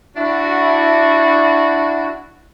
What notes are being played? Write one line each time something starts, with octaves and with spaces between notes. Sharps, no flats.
D4 E4 F#4